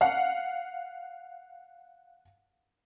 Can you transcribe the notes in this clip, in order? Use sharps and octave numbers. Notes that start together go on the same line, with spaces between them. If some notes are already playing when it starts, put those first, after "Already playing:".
F5 F#5